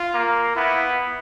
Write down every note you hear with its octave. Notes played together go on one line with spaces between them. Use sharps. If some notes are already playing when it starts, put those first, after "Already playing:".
Already playing: F4
A#3
B3 E4